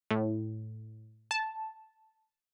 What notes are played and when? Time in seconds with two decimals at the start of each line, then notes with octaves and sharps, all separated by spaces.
0.11 A2
1.31 A5